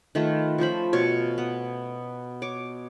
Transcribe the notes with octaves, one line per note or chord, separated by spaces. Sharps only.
D#3 A3 F4 B4
F3 C#4 C5 B5
B2 C#5 F5
B3
C#5 D6